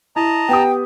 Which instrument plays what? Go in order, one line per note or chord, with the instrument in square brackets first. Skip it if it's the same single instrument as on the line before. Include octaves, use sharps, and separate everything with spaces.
[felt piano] E4 [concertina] D#5 A5 A#5
[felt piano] B3 G4 D#6 [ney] G5